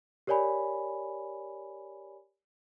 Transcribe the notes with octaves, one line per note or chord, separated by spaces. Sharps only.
G4 A#4 C#5 D5 G#5 B5